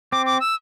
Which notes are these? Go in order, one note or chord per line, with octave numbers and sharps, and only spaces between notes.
C4 D6
D6
E6